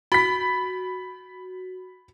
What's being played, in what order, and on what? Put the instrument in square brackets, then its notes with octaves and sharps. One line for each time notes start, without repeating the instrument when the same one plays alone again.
[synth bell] F#4 [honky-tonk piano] B5 B6